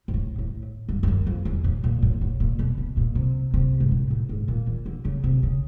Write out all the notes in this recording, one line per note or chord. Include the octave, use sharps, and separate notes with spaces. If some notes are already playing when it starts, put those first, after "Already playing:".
G#2
A2
A2
G2
G2
F#2
F2
E2
A2
A#2
A2
A#2
A2
A#2
B2
B2
A#2
C3
C3
G#2
A2
A2
G#2
A#2
E3
D3
C#3
C3
C#3